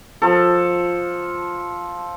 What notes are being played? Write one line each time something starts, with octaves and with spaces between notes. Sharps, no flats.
F3 A4